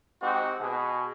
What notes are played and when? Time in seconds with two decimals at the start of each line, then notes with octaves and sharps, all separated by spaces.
0.22 G#3 C4 D#4 F#4 G4
0.60 B2 G#4